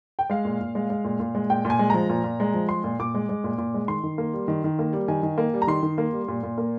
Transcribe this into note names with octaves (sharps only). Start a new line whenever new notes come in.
G5
G#3 F5
A#2
A#2
G#3
G#3
A#2
A#2
G#3
A#2 G5
A#2
G#5
G#3
F3 A#5
A#2
A#2
G#3
F3
G#3 C6
A#2
A#2 D6
G#3
G#3
A#2
A#2
G#3
D#3 C6
D#3
A#3
G3
D#3
D#3
A#3
G3
D#3 G#5
D#3
A#3
G3
A#5
D#3 C6
D#3
A#3
G3
A#2
A#2
A#3